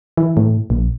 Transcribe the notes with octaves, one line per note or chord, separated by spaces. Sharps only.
E3
A2
A#1